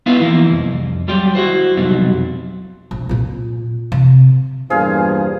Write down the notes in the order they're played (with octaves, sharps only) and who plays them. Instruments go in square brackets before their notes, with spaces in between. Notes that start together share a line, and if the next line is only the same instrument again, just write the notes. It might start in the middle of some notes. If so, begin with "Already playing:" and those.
[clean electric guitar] B3 E4 F4 B4 E5 F5
E3 F3 A#3 E4
C2 F2
F#3 G3 F4 G4 D5
E4 F#4 C5
B1 F2 C3 F#3 G3
[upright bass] A#1
A#2 F4
C3
[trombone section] E2 G2 A#2 [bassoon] F3 [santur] G#4 F5